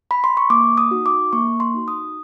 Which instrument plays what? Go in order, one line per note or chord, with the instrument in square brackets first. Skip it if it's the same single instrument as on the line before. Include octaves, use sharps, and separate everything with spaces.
[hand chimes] B5
C6
C#6
A#3 D6
D#6
D#4 F#4
D6
A#3 C#6
C6
D#4 F#4
D#6